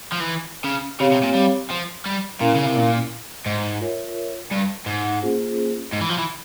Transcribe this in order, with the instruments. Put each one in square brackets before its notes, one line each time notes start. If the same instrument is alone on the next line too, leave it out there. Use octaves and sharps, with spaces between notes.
[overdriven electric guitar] F3
E3
C#3
[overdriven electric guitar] C#3 [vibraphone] C4 G4 C#5 F5
[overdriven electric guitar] C3
A#2
G3
F3
G3
[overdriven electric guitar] A#2 [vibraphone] C#4 E4 A#4 F5
[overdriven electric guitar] C#3
C3
A#2
G#2
[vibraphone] F4 A#4 C#5 E5
[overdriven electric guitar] G2
G#2
[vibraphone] A#3 C#4 F4 G#4 C5
[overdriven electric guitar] G#2
E3
F3
E3